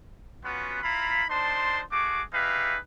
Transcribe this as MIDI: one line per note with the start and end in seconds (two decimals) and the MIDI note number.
0.45 0.82 59
0.45 0.82 61
0.45 0.82 65
0.45 0.82 66
0.45 0.82 71
0.83 1.24 64
0.83 1.24 65
0.83 1.24 77
0.83 1.24 82
0.83 1.24 83
1.30 1.81 62
1.30 1.81 63
1.30 1.81 65
1.30 1.81 72
1.30 1.81 81
1.30 1.81 84
1.92 2.22 57
1.92 2.22 66
1.92 2.22 68
1.92 2.22 86
2.33 2.77 63
2.33 2.77 67
2.33 2.77 68
2.33 2.77 71
2.33 2.77 76
2.33 2.77 77